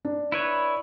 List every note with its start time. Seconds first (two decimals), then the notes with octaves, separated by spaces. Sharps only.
0.05 D4
0.32 E4 B4 C#5